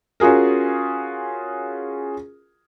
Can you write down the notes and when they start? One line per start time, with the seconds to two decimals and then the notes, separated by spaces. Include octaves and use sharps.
0.20 C#4 F4 F#4 G#4 A#4